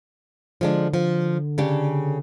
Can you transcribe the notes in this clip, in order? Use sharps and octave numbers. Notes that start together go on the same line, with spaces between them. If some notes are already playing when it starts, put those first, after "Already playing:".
D3 F3 G#3 D4
F3
C#3 D4 G4